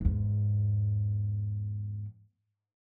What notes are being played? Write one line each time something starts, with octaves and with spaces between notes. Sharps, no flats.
E2 G#2